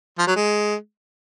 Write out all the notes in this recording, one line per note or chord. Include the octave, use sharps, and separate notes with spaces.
F3
F#3
G#3